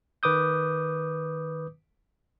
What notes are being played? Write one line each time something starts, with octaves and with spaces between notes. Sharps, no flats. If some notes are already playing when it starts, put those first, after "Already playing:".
D#3 B4 D6 D#6 G6